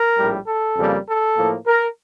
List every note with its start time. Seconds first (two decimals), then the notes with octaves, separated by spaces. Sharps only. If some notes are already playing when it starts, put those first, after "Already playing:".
Already playing: A#4
0.18 A#1 A2 G3
0.47 A4
0.77 F2 C#3 G3 A#3
1.07 A4
1.37 A2 F3 A#3
1.67 A#4